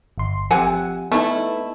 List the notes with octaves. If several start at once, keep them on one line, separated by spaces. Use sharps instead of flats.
G1 C6
C3 F3 F#5 G#5
A3 B3 D#4 E4